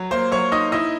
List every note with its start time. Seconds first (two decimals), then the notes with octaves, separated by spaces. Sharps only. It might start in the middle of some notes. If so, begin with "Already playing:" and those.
Already playing: F#3
0.11 A#3 C5 C6
0.31 F#3 C#5 C#6
0.52 D#4 D#5 D#6
0.72 E4 D#5 D#6